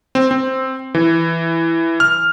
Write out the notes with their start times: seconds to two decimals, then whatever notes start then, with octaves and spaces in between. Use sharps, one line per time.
0.15 C4
0.31 C4
0.95 E3
2.00 F6